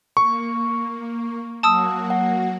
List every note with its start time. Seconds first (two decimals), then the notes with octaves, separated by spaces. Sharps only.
0.17 A#3 C#6
1.63 F#3 A#3 F#4 A5 D#6 E6
2.10 F#5